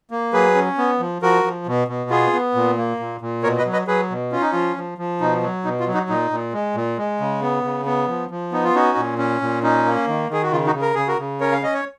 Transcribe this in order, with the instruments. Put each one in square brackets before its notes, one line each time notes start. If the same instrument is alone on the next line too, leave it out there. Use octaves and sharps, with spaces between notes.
[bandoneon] A#3
F#3 G#4 B4
C#4
B3
F3
F3 F#4 A#4
F3
B2
B2
B3 F4 G#4
B3
A#2
A#3
A#2
A#2
B2 A#4 C#5
B4 D#5
F#3
B4 D#5
F#3 G#4 B4
B2
C#4 F4
D#4
F3 F4
F3
F3
B2 D#4
F#3
B2 D#4
F4
F#3
D#4 F#4
A#2 D#4
A#2
G#3
A#2
G#3
C#3
B3
C#3
B3
F3
F3
B3 D#4
F4
C#4 D#4 F#4
A#2
C#4
A#2
C#4 D#4
A#3
D#3
D#3 G#4
F#4
C#3 F4
D#4 F#4
C#3
A#4
C#3 G#4
F#4 A#4
C#3
C#4 A#4 C#5
F5
C#4 D#5
C#5